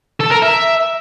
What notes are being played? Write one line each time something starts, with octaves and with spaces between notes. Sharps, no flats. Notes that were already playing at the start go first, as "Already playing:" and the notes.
A4
A#4
E5